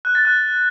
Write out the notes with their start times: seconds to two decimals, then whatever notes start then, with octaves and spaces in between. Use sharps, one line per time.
0.05 F#6
0.15 A6
0.25 F#6